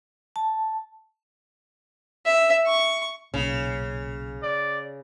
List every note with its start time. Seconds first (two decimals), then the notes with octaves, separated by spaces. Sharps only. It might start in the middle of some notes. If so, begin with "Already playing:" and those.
0.36 A5
2.26 E5
2.66 C#6
3.34 B1 A#2 C#3
4.43 D5